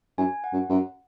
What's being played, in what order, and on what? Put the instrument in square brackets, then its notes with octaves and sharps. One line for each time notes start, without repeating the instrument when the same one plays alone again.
[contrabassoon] F#2 [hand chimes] G#5
[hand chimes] F#5
[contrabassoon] F#2
F#2